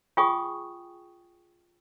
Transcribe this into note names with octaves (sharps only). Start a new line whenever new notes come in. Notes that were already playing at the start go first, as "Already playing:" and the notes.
F4 G#4 G5 G#5 C#6 D#6